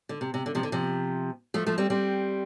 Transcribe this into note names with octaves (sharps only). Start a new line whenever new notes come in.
D3
C3
C3
D3
C3 F3
D3
C3 F3
F3 A3
F3 A3
G3 C4
G3 C4